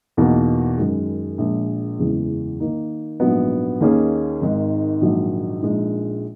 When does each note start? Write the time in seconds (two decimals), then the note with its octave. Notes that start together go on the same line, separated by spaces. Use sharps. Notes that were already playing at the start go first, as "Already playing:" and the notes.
0.17 E2 B2 A#3 D#4
0.78 F#2 D#3 G#3
1.38 A#1 A#2 G#3
1.99 F#1 E2 C#3 E3 G#3
2.60 D#3 A#3 D#4
3.20 A#1 G#2 F#3 B3
3.81 D#2 D#3 A#3 C#4 G#4
4.42 G#1 G#2 D#3
5.01 A#1 G#2 D#3 F#3
5.62 A#1 A#2 G#3 D#4 G#4